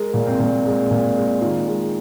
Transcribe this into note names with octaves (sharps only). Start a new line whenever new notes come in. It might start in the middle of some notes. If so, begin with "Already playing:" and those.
Already playing: G#3 A#4
A#2
C4
A#2
G#3
A#2
G#3
D#3 F4
G#3